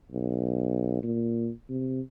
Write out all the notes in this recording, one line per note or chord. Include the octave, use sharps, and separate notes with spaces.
B1
A#2
C3